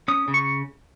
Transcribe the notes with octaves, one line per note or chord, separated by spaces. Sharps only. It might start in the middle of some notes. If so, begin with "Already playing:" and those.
C#4 D#6
C#3
C#6